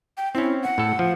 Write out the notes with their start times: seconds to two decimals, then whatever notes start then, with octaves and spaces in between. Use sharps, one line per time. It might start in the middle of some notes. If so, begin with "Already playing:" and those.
0.17 G5
0.35 C4 C#4 E4
0.63 F#5
0.78 A2 A4
0.99 F3